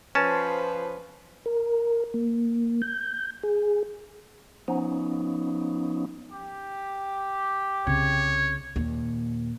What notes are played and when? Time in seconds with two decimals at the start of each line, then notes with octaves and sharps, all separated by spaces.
0.15 F3 C#4 B4 C5 A5
1.46 A#4
2.14 A#3
2.82 G6
3.43 G#4
4.68 F3 B3 C#4 D#4
6.32 G4
7.87 C2 C#3 C#5
8.76 D#2 A#2